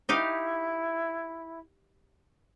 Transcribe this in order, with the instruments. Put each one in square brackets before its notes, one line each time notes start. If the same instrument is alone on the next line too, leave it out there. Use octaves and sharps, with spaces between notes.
[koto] D#4 G4 F5 [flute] E4